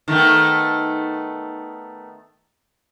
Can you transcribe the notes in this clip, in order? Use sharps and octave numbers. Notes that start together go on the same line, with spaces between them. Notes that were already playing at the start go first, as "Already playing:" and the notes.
D#3 A3 B3